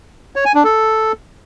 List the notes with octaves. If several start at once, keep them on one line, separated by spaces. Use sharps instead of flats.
C#5
G#5
D4
A4